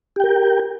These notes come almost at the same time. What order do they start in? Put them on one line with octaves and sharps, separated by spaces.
G4 G5 A#4